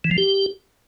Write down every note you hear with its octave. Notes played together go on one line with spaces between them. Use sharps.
E3
F3
G4